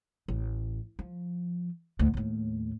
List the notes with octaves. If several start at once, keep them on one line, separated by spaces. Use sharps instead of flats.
A1
F3
D2 A2
D#2 A2